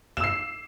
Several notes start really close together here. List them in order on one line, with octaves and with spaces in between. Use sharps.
E7 E6 C7